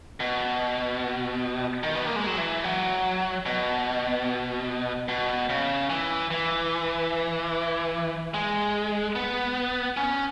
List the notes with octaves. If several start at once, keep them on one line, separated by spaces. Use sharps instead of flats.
B2
D#3
B3
A#3
G#3
F#3
E3
F#3
B2
B2
C#3
E3
E3
G#3
B3
C#4